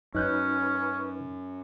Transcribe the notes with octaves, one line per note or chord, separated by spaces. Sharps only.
F#2 C#4 D#4 B4 F#6 G6